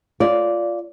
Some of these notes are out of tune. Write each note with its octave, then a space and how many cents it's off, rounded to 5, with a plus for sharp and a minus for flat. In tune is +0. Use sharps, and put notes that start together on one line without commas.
F4 +0 D5 -10